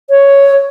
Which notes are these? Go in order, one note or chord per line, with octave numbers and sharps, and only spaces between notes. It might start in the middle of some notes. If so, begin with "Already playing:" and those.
C#5